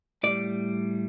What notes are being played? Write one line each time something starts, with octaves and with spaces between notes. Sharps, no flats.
A2 G3 D5